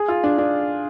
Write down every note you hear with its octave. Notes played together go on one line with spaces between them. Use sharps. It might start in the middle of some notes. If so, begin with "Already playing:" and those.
Already playing: G#4
F4
D4
D4